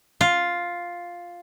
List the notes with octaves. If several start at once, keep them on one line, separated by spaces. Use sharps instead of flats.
F4